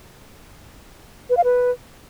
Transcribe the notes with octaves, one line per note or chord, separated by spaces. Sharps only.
B4
F5
B4